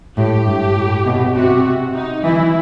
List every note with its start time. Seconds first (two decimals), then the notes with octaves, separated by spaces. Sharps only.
0.17 A2 G4
0.46 G2
0.76 A2
1.06 B2
1.35 C3 F#4
1.94 D#4
2.24 E3 E4